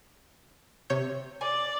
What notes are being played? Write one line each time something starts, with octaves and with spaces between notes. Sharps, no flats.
C3 C#5 G6
D5 G#5